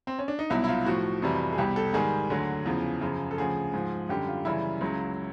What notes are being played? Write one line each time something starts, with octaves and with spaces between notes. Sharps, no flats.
C4
C#4
D4
D#4
C2 B2 F#3 E4
E4
F4
A2 F3 F#4
F2 C3 E3 G3
G#4
C2 B2 G3 G4
A4
G#2 D#3 G3 G#4
D2 D3 F#3
E2 C#3 F3
F#2 C#3 F3
A4
D2 C#3 F3 G#4
G#2 F3
F#2 D3 G3 G4
F4
F#2 C#3 E3 G3 E4
C#2 C#3 F#3